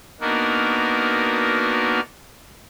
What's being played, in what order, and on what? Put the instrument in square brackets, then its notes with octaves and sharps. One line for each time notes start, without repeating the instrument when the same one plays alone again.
[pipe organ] A#3 B3 D4 D#4 F#4 A#4